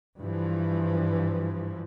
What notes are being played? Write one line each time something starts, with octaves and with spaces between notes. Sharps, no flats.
G2 E3 F3